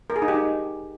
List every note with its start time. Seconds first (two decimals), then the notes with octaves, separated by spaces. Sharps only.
0.10 A#4
0.16 G#4
0.22 D#4
0.28 G4
0.34 D#4